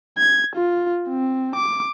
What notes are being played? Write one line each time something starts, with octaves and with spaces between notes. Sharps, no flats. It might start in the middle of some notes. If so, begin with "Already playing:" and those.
G#6
F4
C4
D6